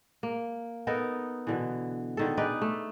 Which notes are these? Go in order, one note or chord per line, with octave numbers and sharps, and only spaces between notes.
A#3
B3 D#4 A4 A#4
B2 D3 E3
D3 D#3 A4
D#4 G#4 B4 D5
A3